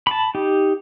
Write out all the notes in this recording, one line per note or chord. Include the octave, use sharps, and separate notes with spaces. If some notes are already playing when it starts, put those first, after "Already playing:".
A5 B5
D#4 G4